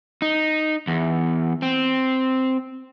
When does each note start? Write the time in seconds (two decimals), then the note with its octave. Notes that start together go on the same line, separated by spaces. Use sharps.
0.22 D#4
0.87 E2
1.62 C4